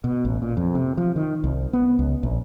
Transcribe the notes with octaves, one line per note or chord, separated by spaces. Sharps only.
B2
A1
A#2
F2
C3
F3
D#3
C2
B3
C#2
A#1